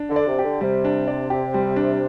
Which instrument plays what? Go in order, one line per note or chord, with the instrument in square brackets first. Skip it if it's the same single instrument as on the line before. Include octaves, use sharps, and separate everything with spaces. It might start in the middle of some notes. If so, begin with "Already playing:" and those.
Already playing: [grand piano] D4
[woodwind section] D3
[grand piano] D5
[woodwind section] C3
[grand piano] G4
[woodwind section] D3
[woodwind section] C3 [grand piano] G3
[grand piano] D4
D5
G4
G3
D4